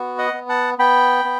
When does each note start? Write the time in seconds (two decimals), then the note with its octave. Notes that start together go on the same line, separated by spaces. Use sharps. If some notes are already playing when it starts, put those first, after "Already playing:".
Already playing: B3 F#4
0.18 D#5 F#5
0.33 B3
0.49 F#5 A5
0.78 B3 G5 B5
1.24 B3